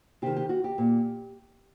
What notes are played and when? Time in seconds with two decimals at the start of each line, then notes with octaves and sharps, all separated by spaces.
0.22 C3 D#3 G4
0.36 G4
0.49 F#4
0.64 G4
0.78 A#2